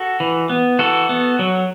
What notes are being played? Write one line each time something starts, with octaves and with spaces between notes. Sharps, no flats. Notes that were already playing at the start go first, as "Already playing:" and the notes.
Already playing: F#4 A4
E3
B3
E3 F#4 A4
B3
F#3